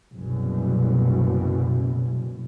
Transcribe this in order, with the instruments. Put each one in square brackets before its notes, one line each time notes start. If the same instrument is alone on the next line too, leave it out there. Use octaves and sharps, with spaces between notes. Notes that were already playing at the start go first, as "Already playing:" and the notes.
[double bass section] F#1 C2 F#2 B2